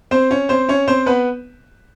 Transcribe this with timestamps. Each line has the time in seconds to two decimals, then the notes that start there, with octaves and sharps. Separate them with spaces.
0.11 C4 C5
0.31 C#4 C#5
0.49 C4 C5
0.69 C#4 C#5
0.88 C4 C5
1.06 B3 B4